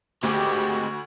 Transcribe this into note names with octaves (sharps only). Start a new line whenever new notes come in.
D2 G#3 C4 F#4 G4